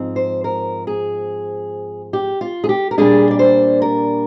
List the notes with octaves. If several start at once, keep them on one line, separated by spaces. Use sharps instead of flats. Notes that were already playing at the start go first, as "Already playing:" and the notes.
Already playing: G#2 F3 C4
C5
A#4
G#4
G4
F4
G#4
G4
A#4
A#2 G3 A#3 D4 G#4
D5
C5
A#4